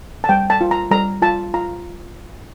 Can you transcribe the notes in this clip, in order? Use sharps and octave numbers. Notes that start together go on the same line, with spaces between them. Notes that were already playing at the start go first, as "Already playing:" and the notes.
A5
G3 G5
A5
F4
A#5
G3 A#5
F4 A5
F4 A#5